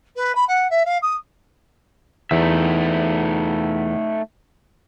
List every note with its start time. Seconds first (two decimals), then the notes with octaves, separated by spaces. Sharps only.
0.16 B4
0.35 B5
0.48 F#5
0.70 E5
0.85 F5
1.02 D#6
2.31 E2 A3 D#4 E5